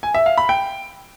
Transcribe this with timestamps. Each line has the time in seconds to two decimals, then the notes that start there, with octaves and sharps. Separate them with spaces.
0.03 G#5
0.14 E5
0.26 F5
0.38 B5
0.49 G5